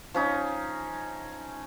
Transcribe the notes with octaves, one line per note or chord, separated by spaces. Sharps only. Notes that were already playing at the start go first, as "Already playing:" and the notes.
F3 C#4 D#4